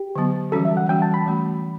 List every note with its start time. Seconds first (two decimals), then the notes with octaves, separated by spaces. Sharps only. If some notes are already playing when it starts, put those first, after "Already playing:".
Already playing: G4
0.16 D3 F#3 B3
0.52 E3 G3 C#4 F#4 A4
0.65 E5
0.77 F#5
0.89 E3 G3 C#4 F#4 G5
1.02 A5
1.14 B5
1.26 E3 A3 C#4 F#4
1.63 E3